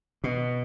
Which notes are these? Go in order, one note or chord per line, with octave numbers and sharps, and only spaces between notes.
B2